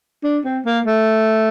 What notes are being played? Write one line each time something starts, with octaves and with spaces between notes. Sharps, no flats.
D4
C4
A#3
A3